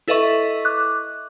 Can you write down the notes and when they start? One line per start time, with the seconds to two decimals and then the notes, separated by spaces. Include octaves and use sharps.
0.08 E4 A4 B4 D#5 E5 C#6
0.65 D6 F#6